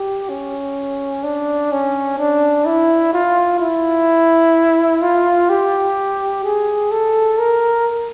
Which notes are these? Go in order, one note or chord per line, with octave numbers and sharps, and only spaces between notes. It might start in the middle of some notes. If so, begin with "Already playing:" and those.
Already playing: G4
C#4
D4
C#4
D4
E4
F4
E4
F4
G4
G#4
A4
A#4